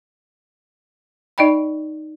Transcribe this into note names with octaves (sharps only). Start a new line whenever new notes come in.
D#4 D5 D#5 G5 B5